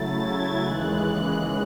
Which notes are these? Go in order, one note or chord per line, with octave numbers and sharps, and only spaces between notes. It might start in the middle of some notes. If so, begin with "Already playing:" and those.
Already playing: C#3 F#3 A3 E4 A6
G#6
D#2 C#3 E3 G#3 F#6